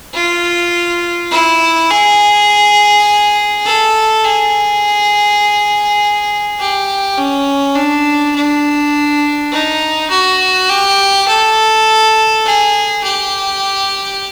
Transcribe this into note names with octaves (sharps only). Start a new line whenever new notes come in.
F4
E4
G#4
A4
G#4
G4
C#4
D4
D4
D#4
F#4
G4
A4
G#4
G4